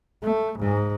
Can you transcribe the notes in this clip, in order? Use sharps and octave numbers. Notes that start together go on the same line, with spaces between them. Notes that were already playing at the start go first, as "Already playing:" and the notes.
A3
G#2